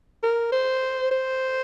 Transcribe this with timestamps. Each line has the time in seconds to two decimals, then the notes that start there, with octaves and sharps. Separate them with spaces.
0.23 A#4
0.52 C5
1.11 C5